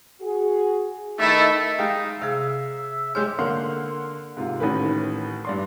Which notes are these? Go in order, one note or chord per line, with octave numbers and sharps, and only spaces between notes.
F#4 G#4
D#3 A3 D#4 E4 E5
G#3 D#4 F5 G5
C3 G#4 E5 F5
G#3 G4 C5 C#5 F6
D3 A#3 F#5 C6 F6
G#2 C3 F4
A1 A2 D#3 B4
G2 D5 C6